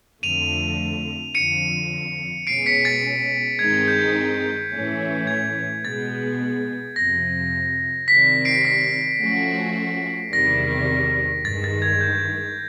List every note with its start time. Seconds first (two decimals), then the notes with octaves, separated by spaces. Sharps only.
0.23 F2 D3 F3 A3 D#7 F7
1.35 F2 D3 F3 C#7 D#7
2.47 B2 G#3 C#4 C7 D7
2.66 B6 C#7
2.85 A6
3.59 G2 D#3 G#3 C4 D#4 G#6
3.88 G6
4.72 A2 E3 A3 C#4
5.27 G#6
5.84 B2 G#3 B3 A6
6.96 F2 C3 F3 A#6
8.08 C3 D#3 G3 C4 B6
8.45 C7 D7
8.65 B6
9.20 F3 A3 C#4 F#4
10.33 E2 C3 D#3 G3 A#6
11.44 G2 D#3 G#3 A6
11.64 A6
11.82 G#6
12.01 G6